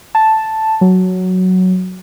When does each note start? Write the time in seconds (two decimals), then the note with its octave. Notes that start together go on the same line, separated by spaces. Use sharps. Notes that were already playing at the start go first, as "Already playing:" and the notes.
0.15 A5
0.81 F#3